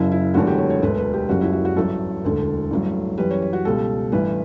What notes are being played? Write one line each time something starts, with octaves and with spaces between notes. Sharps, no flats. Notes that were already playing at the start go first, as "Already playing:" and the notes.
Already playing: F#1 F#2 C#3 E4
E4
E1 E2 D3 F#3 A3 F#4
G4
C#5
C#5
E1 D2 D3 B4
B4
G4
F#1 F#2 C#3 G3 F#4
E4
F#4
F#4
A1 G2 F#3 A3 A4
E1 D2 D3
A1 G2 F#3
F#2 E3 G3 B4
C#5
C#5
F#4
C#2 B2 G3 A4
A1 G2 E3 B4